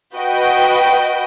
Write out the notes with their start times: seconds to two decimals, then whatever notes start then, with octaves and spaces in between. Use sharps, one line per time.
0.16 F#4 B4 D#5 G5